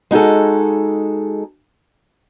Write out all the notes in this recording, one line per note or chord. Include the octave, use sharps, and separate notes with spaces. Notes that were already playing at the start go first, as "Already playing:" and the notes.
G#3 D#4 F#4 G#4 A4